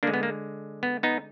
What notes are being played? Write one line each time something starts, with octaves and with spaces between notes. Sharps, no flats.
D3 G#3 A#3 D4
B3
A#3
B3
B3 D#4